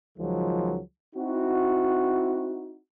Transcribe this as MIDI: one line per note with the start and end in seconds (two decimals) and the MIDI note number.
0.18 0.80 37
0.18 0.80 51
0.18 0.80 53
0.18 0.80 54
0.18 0.80 56
1.15 2.78 60
1.15 2.78 63
1.15 2.78 64
1.15 2.78 66